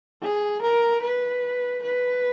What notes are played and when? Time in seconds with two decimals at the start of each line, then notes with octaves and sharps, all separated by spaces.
0.22 G#4
0.62 A#4
1.02 B4
1.83 B4